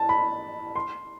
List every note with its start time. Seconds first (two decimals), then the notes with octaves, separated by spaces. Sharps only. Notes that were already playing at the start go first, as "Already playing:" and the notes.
Already playing: A5
0.09 B5
0.76 C6